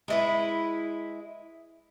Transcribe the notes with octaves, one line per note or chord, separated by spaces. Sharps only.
G#3 E4 B4